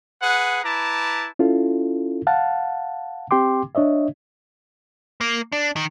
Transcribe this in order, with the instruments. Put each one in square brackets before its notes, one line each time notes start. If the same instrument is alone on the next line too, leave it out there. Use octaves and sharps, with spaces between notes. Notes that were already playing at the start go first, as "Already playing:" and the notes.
[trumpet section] G#4 B4 F#5
E4 B4 A5 A#5 D6
[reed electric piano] C#4 E4 F4 A4
F5 F#5 A5
C4 G4 G5 C6 D6
D4 C#5 D#5 E5
[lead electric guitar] A#3
D4
D#3